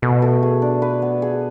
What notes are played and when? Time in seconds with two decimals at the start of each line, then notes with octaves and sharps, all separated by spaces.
0.02 B2 A3
0.22 A3
0.43 G#4
0.62 D4
0.82 B4
1.02 B3
1.22 G#4